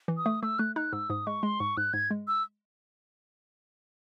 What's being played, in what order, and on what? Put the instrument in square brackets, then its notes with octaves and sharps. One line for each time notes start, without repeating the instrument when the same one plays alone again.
[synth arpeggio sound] E3
[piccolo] D#6
[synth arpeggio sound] A3
[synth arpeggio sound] A3 [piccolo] E6
[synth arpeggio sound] A3 [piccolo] F#6
[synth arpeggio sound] D#4 [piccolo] F#6
[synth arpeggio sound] G#2 [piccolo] E6
[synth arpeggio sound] G#2 [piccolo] D#6
[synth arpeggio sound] G#3 [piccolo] C#6
[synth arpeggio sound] G#3 [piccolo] C6
[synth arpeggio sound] G#2 [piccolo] C#6
[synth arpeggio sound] G#2 [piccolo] F#6
[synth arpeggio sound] G#2 [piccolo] G#6
[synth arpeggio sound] G#3
[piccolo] E6